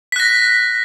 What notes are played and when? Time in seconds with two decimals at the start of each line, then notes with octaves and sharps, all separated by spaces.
0.12 B6
0.16 F#6
0.20 A#6